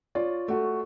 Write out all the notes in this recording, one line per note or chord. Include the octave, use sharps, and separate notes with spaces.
F4 C#5 D5
A3 F#4